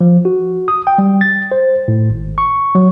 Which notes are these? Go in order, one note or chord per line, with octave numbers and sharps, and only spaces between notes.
F3
F#4
D#6
G5
G3
A6
C5
A2
G#1
C#6
F#3